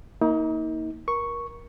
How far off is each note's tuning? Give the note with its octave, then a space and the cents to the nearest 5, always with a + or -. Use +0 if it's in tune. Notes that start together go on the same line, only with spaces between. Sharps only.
A#3 +0 D#4 +35
A#4 +25 C#6 +0